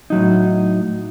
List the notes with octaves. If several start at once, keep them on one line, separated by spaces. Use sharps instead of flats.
A2 F#3 D#4